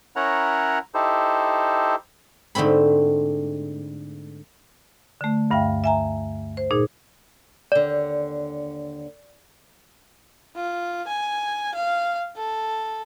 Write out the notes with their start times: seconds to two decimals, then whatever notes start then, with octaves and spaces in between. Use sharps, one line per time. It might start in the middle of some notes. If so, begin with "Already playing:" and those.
0.16 C#4 E4 A#4 C#5 F#5 A#5
0.94 D#4 E4 G4 A4 C5
2.55 G#2 D3 A3 C4 B5
5.21 D3 A3
5.51 D2 G2 E5 F5 G5
5.84 E5 G#5 A#5
6.57 C5
6.71 A#2 D#4 G#4
7.72 D#2 D3 D5
10.56 F4
11.07 G#5
11.74 F5
12.36 A4